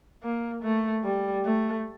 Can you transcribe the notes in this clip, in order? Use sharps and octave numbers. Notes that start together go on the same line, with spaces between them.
A#3
A3
G3
A3